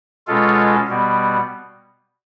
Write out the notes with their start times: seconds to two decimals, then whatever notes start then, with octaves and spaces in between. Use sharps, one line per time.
0.27 B2 G#3 C#4 F4 A4
0.88 B2 G3 B3